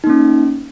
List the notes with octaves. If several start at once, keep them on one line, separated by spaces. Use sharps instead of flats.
A#3 C#4 D#4